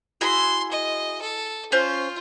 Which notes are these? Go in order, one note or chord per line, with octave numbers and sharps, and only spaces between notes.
E4 F#4 G#4 C6
D#5
A4
C#4 F4 C5